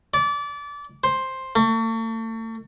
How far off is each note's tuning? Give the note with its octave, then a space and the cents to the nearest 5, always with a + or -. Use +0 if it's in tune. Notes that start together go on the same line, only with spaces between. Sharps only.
D5 -25
C5 +5
A3 +40